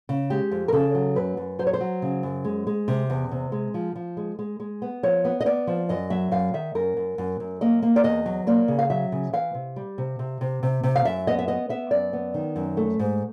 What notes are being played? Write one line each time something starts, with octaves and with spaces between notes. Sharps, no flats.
C#3
G#3 G4
F2
A#4
C#3 A4
F#3
F#2 B4
F#2
F#3 C5
C#5
C5
F#3
C#3
F#2
G#3
G#3
C3
E2
C3
G#3
F3
F3
G#3
G#3
G#3
B3
F3 C#5
B3
D#5
B3 D5
F3
F#2 D#5
F#3 E5
F#2 F5
D#3 E5
F#2 A#4
F#2
F#2
F#2
A#3 D#5
A#3
D5
E2 D#5
F#3
A#3 D5
C#3
F5
F#3 E5
C#3
E3 F5
C3
G3
C3
C3
C3
C3
C3
F5
F#2 E5
B3 D#5
E5
B3 D#5
B3 E5
F#2 D5
B3
D#3
F#2
A3
G#2